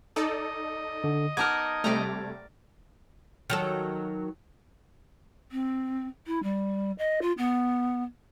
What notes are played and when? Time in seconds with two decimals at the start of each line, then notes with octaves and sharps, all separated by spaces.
0.16 D#4 A4 D5 D#5
1.04 D3
1.37 B3 D#4 A#4 A5 D6 G#6
1.84 C3 G3 A3 D5 A#5
3.50 D#3 F#3 A4
5.52 C4
6.27 E4
6.43 G3
6.99 D#5
7.22 F4
7.38 B3